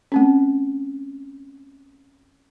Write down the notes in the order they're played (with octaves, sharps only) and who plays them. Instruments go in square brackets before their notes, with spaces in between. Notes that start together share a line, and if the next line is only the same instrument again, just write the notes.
[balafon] A3 C4 C#4